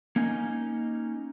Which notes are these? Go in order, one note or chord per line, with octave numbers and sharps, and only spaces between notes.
A#3 C#4 D#4 G#5